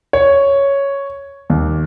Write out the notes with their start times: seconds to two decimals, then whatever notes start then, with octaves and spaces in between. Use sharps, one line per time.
0.13 C#5
1.50 D#2